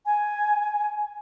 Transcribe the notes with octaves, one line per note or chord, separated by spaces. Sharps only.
G#5